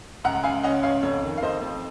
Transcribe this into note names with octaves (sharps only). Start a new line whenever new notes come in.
C#2 F#5 A#5
A#5
C#2 F5 G#5
C#4 D#5 F#5
C#2 C#5 F5
F2 C#5
D#3
F5
F2 C5 D#5
F2